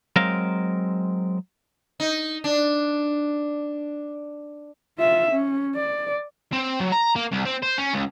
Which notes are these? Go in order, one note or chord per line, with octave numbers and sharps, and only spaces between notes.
F#3 G#3 C4 A#4 F5
D#4
D4
F4 E5
C#4
D5
C4
F#3
A#5
A#3
C2
C4
C5
C#4
C#2